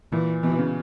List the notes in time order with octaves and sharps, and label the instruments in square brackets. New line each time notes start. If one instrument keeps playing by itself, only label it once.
[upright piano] A#2 [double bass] E3
[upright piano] B2 [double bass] E3
[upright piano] C#3